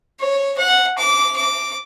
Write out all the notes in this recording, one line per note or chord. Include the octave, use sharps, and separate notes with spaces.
C#5
F#5
D6
D6